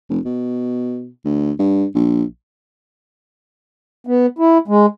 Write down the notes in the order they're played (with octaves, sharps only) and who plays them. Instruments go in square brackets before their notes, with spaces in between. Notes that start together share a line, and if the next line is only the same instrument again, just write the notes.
[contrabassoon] F1
B2
D2
G2
A#1
[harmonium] B3
E4
G#3